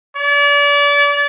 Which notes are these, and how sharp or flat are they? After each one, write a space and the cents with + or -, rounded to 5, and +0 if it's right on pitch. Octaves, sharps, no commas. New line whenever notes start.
D5 -35